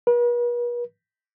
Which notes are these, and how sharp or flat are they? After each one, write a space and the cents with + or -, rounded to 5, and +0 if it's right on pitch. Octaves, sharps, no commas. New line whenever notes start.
B4 -45